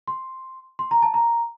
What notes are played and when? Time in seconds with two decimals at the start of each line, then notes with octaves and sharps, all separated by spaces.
0.08 C6
0.79 C6
0.91 A#5
1.02 A5
1.14 A#5